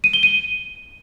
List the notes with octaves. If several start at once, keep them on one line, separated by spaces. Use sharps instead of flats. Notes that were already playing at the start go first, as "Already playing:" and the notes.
D#7
G7
D#7